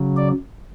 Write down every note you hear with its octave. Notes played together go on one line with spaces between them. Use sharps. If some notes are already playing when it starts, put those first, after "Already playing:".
Already playing: C#3 F#3
D5